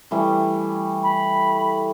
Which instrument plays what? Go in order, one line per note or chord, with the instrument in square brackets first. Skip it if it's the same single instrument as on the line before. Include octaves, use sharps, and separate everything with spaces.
[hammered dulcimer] E3 G3 A3
[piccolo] B5